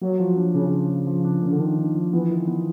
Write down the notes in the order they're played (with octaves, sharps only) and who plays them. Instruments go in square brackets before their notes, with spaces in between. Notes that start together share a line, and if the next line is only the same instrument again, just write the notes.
[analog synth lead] F#3 [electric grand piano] A#3
[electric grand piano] F3
D4
[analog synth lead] C#3 [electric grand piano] D4
[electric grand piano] D4
F3
F3
D4
[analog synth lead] C#3 [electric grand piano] A#3
[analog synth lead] D3
[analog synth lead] D#3 [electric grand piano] D4
[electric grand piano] D4
F3
[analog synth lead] E3 [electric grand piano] B3
[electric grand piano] D#3
B3